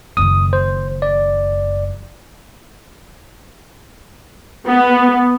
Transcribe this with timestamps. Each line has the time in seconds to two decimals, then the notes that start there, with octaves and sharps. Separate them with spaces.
0.17 F#1 D#3 D#6
0.53 C5
1.02 D5
4.67 B3